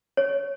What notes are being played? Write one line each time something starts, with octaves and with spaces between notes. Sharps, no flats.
C#5